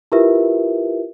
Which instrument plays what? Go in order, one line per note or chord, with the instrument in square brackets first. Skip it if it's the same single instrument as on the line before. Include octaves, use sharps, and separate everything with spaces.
[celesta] E4 F4 G4 A#4 B4 E5